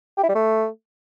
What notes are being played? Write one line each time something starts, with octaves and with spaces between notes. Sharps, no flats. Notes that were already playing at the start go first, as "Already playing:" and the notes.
G4
E4
G3
A3